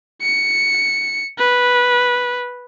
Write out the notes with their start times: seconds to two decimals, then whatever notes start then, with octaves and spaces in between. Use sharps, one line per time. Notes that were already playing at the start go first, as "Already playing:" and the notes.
0.22 C#7
1.38 B4